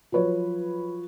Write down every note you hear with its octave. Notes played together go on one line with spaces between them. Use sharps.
F3 F#3 B4 C#5